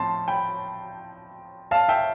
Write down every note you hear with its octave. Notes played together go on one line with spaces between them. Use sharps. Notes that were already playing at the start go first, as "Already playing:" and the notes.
Already playing: A2 F3 C4 A5 C6
G5 B5
F5 A5
E5 G5